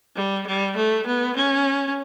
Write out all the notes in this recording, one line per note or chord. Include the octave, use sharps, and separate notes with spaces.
G3
G3
A3
B3
C#4